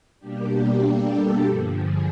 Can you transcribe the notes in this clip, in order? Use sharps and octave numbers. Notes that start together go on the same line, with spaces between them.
B2 G3 A#3 D4 G4
A4
G2 D3 F3
G#4